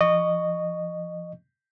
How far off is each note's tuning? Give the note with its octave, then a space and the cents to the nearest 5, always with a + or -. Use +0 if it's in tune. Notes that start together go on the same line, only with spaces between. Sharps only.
F3 -30 D#5 -20 C#6 +10